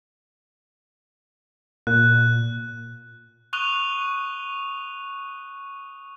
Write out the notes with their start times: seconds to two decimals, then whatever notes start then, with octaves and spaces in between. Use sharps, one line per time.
1.87 A#2 F#6
3.53 C#6 D#6 F#6 D#7 F7 G7